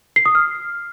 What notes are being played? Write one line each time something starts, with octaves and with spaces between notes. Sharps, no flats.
C7
D#6
F6